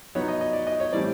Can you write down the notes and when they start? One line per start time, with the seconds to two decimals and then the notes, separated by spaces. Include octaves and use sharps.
0.15 F#3 B3 D#4 C#5
0.28 D#5
0.41 D#5
0.53 D5
0.67 D#5
0.80 C#5
0.92 A2 E3 G3 C4 D5